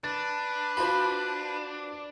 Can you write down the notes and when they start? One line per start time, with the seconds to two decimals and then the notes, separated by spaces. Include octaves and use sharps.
0.04 D4 B4 A6
0.77 F4 F#4 C5 B5